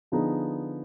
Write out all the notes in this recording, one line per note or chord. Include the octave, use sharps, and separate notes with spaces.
D3 F3 B3 D#4 G#4